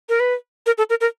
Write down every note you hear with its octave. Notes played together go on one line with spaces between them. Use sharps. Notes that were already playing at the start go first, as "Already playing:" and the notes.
A#4
B4
A#4
A4
A#4
A#4